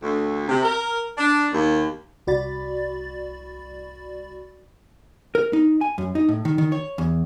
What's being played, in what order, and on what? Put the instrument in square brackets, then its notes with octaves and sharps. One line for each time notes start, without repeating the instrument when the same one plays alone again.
[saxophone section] D2
C3
A#4
D4
D#2
[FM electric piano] C2 F#4 D5 B5 A6
[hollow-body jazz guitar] A#4
D#4
G#5
F#2
D#4
A2
D#3
D#3
C#5
E2